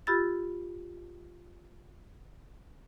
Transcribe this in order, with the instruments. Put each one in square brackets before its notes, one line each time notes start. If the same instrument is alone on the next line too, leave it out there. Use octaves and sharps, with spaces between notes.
[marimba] F4 G4 B5 E6 A6